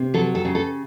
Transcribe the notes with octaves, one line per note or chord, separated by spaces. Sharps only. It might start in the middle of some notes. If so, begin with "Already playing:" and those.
Already playing: C3
F#3 A4
A4
C#3
A4